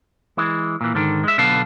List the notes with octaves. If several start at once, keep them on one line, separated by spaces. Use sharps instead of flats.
E3 G#3
A#2 E3
G#2 D3 D#3
G#3 E5
B1 D3 B3 B4 F5 A5